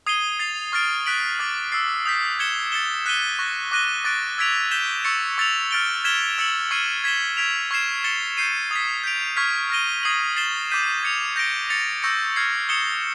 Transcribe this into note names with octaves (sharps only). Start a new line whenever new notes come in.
D#6 G#6 C7 D#7 G7
A6 C7 F7
C#6 F6 A6 D7
F#6 B6 D7 F#7
D6 F6 A6
E6 A6 C7
D#6 G6 B6
G#6 C#7 E7 G7
A6 C#7 E7 G7
F#6 B6 D#7 G7
C#6 F#6 A#6
D6 F#6 A#6 D#7 G7
D6 F#6 A6 D7
E6 G#6 B6 D7 F7
G6 B6 E7 G7
C#6 E6 A6 C#7
C#6 E6 A6 C#7 F7
F6 A6 D7 G7
F6 G#6 B6 E7 G7
E6 A6 C#7 F#7
C#6 F6 G#6 C7 D#7
G#6 B6 E7 G7
E6 G#6 B6 D7 F7
C#6 F6 G#6 C7 E7
A6 C#7 E7 G7
G6 C7 D#7
D#6 G#6 B6
G6 B6 D7 F7
C#6 F6 G#6 B6
F6 A#6 D#7 G7
D#6 G#6 C7 D#7 F#7
A6 C7 E7 G7
D6 G6 B6 D#7
G#6 C#7 F7
G6 A#6 D7 G7
A6 C#7 F7
C#6 E6 G6 A#6 C#7
F6 G#6 C7
D#6 G#6 C#7 E7 G7